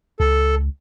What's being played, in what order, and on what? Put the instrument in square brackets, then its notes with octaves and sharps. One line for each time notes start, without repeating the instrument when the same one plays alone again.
[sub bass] C#2 [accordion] A4